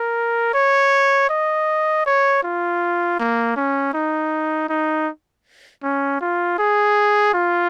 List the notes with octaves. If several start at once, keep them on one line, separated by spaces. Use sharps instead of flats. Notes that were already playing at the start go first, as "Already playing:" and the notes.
Already playing: A#4
C#5
D#5
C#5
F4
A#3
C#4
D#4
D#4
C#4
F4
G#4
F4